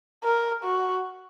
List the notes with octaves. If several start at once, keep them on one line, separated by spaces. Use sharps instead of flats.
A#4
F#4